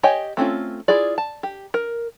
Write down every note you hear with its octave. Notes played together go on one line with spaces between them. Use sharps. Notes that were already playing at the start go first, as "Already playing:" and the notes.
G4 C#5 D#5 G5 G#5
A3 C4 C#4 F4
E4 F4 G#4 D5
A5
G4
A#4